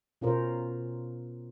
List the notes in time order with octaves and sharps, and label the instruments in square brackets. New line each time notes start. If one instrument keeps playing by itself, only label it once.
[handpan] B2 C#4 F4 A#4 C5